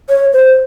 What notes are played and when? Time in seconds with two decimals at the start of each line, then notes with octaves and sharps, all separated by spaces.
0.09 C#5
0.33 C5